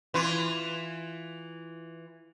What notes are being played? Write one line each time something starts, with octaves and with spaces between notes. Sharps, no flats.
E3 F4